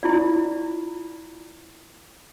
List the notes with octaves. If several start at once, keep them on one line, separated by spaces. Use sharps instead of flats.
E4 F4 D5